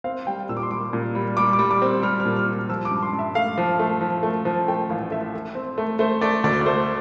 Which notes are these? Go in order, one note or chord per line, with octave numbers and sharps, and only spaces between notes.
C4 F5
G3 G5
A#2 E6
D6
C6
G3 D6
A#2
G3
G3 D6
D6
G3
D6
C4
G3 F6
F6
A#2
F6
G3
F6
F3 E6
D6
G2
C6
G2
E5
A3 F5
F3
A3
F3
A3
F3
A3 G5
A1 F5
A3 E5
A3
C4
A3
A3 C5
A3 D5
D2 D5
D5
A3 C5